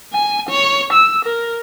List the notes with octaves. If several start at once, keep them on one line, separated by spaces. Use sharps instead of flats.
G#5
C#5
E6
A#4